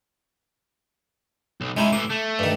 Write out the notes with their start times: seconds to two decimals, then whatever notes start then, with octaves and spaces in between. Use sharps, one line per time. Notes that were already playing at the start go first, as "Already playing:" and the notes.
1.61 B1
1.77 F#2 G#3 D#4 E4
1.93 A2 E3 D6
2.10 A3
2.39 G2 D#3